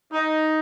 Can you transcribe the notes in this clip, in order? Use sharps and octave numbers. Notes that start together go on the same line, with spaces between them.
D#4